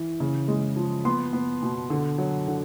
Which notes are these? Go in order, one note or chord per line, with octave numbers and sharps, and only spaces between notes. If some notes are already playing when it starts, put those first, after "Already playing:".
Already playing: E3
C#3
G#3
F3
B3 C6
B3
B2
D3
F#3
D3